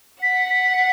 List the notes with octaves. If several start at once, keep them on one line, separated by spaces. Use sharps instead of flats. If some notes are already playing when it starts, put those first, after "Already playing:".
F#5 B6
B6
B6